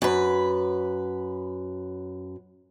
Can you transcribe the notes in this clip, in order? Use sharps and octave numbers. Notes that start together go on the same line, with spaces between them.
F#2 B4